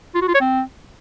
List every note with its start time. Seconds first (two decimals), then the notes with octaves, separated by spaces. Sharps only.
0.15 F4
0.21 F#4
0.28 F4
0.34 C#5
0.41 C4